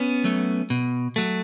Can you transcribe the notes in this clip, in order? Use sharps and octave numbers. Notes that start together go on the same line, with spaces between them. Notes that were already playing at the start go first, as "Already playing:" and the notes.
Already playing: B3 C#4
F#3 A3
B2
F#3 A3